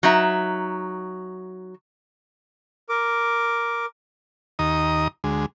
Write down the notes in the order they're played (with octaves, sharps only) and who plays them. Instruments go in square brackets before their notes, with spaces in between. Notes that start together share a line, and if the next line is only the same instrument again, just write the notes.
[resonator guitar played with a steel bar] F#3 D#4 E5
[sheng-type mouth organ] A#4 D6
[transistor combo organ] D#2 D#5 A#5
D2 G#3